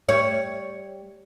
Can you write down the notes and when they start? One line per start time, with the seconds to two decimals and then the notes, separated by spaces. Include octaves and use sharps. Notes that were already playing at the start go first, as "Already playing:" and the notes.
0.09 G3 C#5